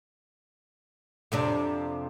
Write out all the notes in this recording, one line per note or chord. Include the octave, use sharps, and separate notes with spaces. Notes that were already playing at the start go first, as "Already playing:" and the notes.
F2 C3 D4